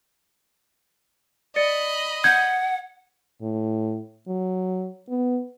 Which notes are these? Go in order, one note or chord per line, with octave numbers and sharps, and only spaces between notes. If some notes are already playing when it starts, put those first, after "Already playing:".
D5 D#5 B5 A6 C#7
F#5 G6 G#6
A2
F#3
B3